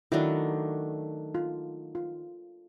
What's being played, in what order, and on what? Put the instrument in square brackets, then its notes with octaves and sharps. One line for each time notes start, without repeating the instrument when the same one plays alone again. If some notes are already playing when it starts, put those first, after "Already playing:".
[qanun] D#3 F#3 A3 D4 [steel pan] E4
[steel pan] F4
F4